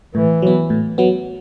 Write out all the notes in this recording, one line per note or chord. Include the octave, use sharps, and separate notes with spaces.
A2 E3
F#3 B3
A2
F#3 B3